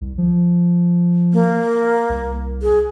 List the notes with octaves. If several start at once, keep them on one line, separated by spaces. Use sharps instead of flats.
C2
F3
A#3
C2
G#4